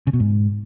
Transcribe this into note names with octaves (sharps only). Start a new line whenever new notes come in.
C#3
B2
G#2